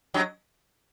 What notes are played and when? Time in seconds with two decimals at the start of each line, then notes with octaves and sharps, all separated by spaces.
0.14 F#2 F#3